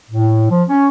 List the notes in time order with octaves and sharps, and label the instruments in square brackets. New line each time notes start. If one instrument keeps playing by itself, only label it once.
[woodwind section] A2
F3
C#4